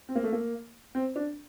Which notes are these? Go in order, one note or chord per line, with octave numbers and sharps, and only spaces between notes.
C4
A#3
A3
A#3
C4
D4